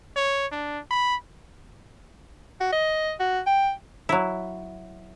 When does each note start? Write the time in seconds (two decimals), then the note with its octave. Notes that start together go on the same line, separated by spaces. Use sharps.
0.16 C#5
0.52 D4
0.91 B5
2.60 F#4
2.72 D#5
3.19 F#4
3.47 G5
4.09 F#3 E4